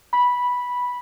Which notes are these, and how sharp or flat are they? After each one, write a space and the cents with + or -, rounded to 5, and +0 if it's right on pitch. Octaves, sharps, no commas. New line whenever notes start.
B5 -10